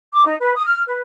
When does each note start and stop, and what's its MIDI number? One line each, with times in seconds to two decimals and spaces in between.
0.13 0.23 86
0.26 0.35 63
0.39 0.54 71
0.55 0.66 87
0.66 0.82 89
0.86 1.01 71